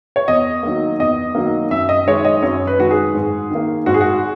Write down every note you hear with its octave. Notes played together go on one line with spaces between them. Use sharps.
C#5
E2 D#5
D#3 F#3 A#3
E2 D#5
D#3 F#3 A#3
F#2 E5
D#5
D#3 G#3 C#5
D#5
F#2 C#5
B4
D#3 G#3 F#4
G#4
G#2
D#3 A#3
G#2 F#4
G#4
F#4